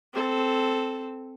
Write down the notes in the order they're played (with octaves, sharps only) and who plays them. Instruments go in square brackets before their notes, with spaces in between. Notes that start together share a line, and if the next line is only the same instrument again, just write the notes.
[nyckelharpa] C4 A4